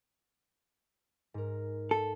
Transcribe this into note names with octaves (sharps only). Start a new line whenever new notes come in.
G#2 A#4
A4